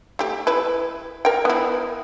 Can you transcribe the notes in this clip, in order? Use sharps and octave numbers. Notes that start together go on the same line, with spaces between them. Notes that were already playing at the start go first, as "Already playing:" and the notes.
A3 G4
E4 B4
A#4 G5
B3 E4